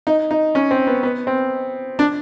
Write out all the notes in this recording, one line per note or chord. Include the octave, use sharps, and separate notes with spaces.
D#4
D#4
C#4
C4
B3
B3
C4
D4